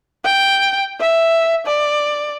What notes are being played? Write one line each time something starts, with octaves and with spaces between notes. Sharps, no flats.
G5
E5
D5